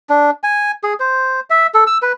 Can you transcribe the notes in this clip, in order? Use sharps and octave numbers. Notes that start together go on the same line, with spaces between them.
D4
G#5
G#4
C5
E5
A4
E6
B4